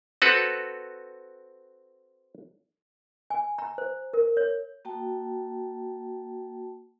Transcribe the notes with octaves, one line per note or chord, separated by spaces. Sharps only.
C4 F#4 A4 B4
G#5
A#5
C5
A#4
C#5
A#3 F#4 G5 A5